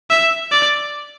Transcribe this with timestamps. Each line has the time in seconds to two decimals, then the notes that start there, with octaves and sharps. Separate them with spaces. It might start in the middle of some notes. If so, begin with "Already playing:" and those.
0.10 E5
0.51 D5